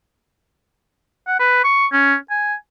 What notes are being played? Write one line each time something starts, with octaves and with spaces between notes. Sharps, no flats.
F#5
B4
C#6
C#4
G#5